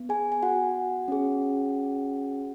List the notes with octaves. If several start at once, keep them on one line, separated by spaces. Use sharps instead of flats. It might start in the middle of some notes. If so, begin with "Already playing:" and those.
Already playing: B3
G#4 G#5
G#5
F#4 F#5
C#4 G#4